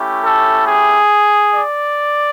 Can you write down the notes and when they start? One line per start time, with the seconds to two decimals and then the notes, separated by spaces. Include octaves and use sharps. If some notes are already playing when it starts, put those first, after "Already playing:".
Already playing: A3 C#4 E4 G4
0.22 A4
0.67 G#4
1.55 D5